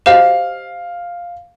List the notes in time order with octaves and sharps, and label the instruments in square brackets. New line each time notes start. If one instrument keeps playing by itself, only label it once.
[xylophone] G4 C5 D#5 [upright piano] F5